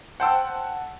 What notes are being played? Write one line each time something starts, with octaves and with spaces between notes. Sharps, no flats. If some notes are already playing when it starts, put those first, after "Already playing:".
C5 F#5 G5 A5 E6